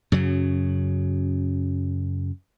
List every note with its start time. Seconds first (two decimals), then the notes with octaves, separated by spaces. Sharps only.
0.12 F#2 C#3 F#3